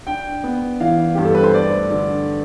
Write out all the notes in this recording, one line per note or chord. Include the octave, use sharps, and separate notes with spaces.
D4 G5
B3
E3 F5
G2 G4
A4
B4
C5
A3 D5
D3